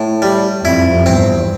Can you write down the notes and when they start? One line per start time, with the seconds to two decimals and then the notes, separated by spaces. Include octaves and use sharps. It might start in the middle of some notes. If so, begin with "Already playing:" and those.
Already playing: A2
0.22 G3
0.65 F2 E4
1.06 E2 G2 C4